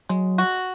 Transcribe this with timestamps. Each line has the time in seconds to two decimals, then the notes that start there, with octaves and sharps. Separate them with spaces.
0.09 F#3 G#3
0.38 F#4